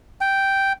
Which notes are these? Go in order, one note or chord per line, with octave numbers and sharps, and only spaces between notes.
G5